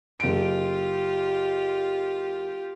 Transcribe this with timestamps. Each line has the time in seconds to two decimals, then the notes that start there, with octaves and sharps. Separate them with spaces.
0.20 F#1 F4 G4 D7